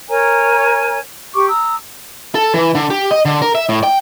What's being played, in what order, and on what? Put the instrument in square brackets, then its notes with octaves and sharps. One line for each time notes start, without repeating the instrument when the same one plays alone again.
[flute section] A#4 C#5 G#5 A#5
G4 C#6 D6
A#5 D#6 E6
[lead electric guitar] A4
E3
D3
G4
D#5
D3
A#4
E5
A2
G5